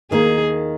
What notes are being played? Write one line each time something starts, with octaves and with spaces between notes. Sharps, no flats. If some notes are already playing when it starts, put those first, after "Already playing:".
D#2 D#3 A#3 D#4 G#4